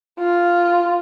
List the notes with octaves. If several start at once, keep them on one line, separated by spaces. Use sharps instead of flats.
F4